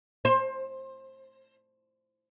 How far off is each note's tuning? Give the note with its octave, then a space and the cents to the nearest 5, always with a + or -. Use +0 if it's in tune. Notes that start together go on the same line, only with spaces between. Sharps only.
C5 +25